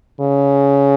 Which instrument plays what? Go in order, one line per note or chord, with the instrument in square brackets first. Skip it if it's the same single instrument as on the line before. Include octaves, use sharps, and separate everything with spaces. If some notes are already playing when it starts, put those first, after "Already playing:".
[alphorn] C#3